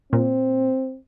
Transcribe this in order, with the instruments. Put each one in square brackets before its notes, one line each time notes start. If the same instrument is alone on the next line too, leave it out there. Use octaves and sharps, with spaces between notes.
[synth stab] A#2 [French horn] C4